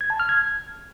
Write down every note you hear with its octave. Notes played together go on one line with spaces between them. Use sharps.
G#6
A5
F6
G#6